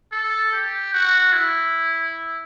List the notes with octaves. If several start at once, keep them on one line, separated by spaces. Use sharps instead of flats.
A4
G4
F#4
E4